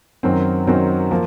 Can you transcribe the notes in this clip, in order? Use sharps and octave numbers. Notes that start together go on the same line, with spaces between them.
F#2 D#3 F#3 C4
F#2 D#3 F#3 C4
F3 A#3